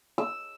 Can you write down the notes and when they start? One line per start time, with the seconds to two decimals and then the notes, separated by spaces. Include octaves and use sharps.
0.18 E6